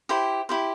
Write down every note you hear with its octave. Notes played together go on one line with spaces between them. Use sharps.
E4 G4 C5
E4 G4 C5